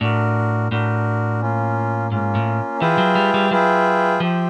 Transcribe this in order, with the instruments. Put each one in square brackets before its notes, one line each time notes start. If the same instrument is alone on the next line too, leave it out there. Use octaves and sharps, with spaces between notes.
[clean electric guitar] A2 [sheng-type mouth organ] D4 F#4 A#4
[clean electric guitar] A2 [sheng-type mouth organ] D4 F#4 A#4
[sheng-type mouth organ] A#3 C#4 F4
[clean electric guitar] G#2 [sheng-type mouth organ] A#3 C#4 F4
[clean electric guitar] A2
[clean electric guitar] E3 [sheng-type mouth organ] F4 G#4 B4 E5 G5
[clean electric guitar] F#3
G3
G3
[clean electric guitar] F#3 [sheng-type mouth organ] F4 G#4 B4 E5 G5
[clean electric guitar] F3 [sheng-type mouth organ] G4 C5 E5 G5